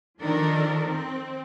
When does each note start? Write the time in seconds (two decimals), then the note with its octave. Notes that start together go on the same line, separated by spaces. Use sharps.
0.19 D#3 F3 D4 A4 A#4
0.86 C4